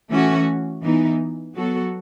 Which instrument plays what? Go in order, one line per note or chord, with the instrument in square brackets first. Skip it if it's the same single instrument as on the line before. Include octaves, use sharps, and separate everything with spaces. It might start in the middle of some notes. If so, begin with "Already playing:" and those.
[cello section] E3 A3 C#4 F#4
E3 B3 D#4
F#3 B3 F#4 A4